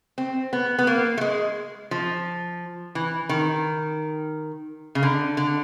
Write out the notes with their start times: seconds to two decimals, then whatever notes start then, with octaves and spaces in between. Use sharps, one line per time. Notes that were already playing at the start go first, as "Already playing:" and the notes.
0.18 C4
0.53 B3
0.79 B3
0.87 A#3
1.17 A3
1.21 G#3
1.91 F3
2.95 E3
3.29 D#3
4.95 C#3
5.03 D3
5.37 D3